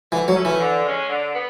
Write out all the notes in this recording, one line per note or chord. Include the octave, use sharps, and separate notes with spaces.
D3 E3
F#3
A3 C#4
E3
D3
G#3 C#4
D3
B3